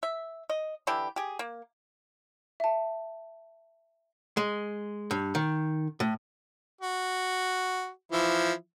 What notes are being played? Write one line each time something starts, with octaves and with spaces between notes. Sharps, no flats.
E5
D#5
D3 E3 E4 G4
G4 G#4
A#3
E5 A5
G#3
G2
D#3
A2
F#4
E3 F3 E4